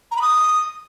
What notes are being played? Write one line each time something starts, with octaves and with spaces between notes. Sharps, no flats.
A#5
B5
D#6